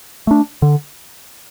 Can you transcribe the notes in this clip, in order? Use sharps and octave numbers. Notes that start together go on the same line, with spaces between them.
A3 D4
D3